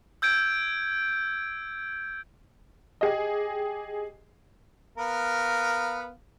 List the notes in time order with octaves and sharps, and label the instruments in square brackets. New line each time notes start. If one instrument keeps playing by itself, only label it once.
[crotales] E6 G6 G#6 D7
[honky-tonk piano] G4 G#4 D#5
[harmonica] B3 A#4 F5